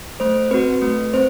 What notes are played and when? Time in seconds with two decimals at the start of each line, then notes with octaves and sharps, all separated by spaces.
0.20 A3 C5
0.51 C4 F#4 B4
0.82 A3 B4
1.13 C4 C5